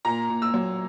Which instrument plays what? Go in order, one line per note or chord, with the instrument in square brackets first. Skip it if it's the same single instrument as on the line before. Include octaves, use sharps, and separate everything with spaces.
[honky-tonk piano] A#2 A#5
A#2
E6
F#3